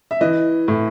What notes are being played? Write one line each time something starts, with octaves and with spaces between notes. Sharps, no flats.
E5
E3 D#5
A2